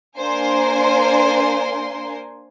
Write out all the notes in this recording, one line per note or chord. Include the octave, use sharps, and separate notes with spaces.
A#3 D4 A#4 C5 G#5 C6